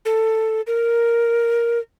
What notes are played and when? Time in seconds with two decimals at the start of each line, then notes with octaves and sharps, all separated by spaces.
0.05 A4
0.67 A#4